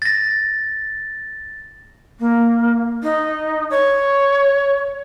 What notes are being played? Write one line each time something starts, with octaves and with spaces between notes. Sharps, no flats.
A6 A#6
A#3
D#4
C#5